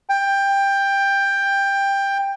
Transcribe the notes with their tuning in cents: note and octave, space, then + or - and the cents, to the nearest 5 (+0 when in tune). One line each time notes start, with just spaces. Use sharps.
G5 +15